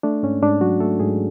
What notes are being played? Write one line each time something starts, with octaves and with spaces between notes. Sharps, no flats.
A3 D4
G#2 C#4
G#2 D4
F#3 F#4
A3 A4
G#2 G#4